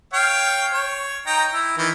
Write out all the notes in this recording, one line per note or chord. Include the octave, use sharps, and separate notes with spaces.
C#5 F5 G5
C#5
D#4 G5 A#5
E4
D#3 E3